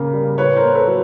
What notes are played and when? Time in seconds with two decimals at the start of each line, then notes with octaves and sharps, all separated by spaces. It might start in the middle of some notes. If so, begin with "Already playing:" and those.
Already playing: C#3 A#3
0.13 G3
0.38 A2 B4 C#5
0.56 A#4 C5
0.63 A#3
0.75 A4 B4
0.87 F#3